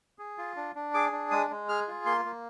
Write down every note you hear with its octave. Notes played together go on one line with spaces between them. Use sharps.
G#4
F4
D4
D4
G#4 D6
D4
G#3 D#6
G#3
G#4 F6
F4
A#3 C6
A#3